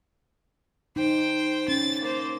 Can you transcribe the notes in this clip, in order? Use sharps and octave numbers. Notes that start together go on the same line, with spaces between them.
D#4 C5 G5
C#4 A6
A#3 C5